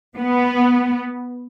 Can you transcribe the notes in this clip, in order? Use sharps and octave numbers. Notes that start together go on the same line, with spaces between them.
B3